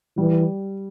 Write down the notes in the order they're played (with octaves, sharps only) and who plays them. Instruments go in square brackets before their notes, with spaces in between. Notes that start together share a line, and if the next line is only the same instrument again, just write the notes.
[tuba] E3 [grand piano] G3